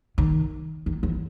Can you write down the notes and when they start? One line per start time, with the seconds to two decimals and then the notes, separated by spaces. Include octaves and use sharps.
0.18 D#3
0.86 D#3
1.03 E3